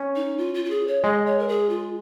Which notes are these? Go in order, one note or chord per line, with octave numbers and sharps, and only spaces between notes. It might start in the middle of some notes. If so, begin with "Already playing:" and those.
Already playing: C#4
D#4
F4
F4
F4
G#4
C#5
G#3 D#5
C#5
A#4
G#4
F4